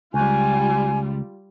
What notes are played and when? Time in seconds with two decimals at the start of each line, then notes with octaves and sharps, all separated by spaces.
0.14 C#2 G3 F4 G#5